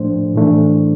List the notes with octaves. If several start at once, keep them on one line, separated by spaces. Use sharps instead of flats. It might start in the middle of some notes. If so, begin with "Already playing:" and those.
Already playing: A2 F3 A3 D4 C5
A2 E3 A3 D4